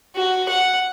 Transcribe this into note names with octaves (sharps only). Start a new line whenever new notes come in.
F#4
F#5